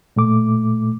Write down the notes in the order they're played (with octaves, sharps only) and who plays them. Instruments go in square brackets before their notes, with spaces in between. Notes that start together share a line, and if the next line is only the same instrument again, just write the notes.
[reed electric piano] A#2 A3 D6